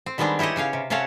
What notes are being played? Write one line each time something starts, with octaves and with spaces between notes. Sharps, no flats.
C4
D#3 G3 G#3 B3 C4 D4
E4 G4 C#5 D#5 F#5
C#3 C#4 C#5 F5
C3
C3 C#4 A4 C#5 F5 F#5